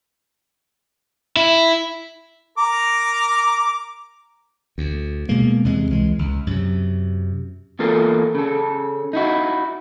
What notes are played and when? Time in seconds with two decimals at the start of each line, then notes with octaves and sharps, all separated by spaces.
1.36 E4
2.58 A#4 A#5 D6
4.78 D2
5.29 B2 G#3 A#3
5.64 E2 C3 G#3
5.91 C#2 E3 G#3
6.19 C#2
6.47 F#2 C3
7.79 E2 A#3 F4 A4 A#4
8.35 C#3 A4
9.13 D#4 E4 F#4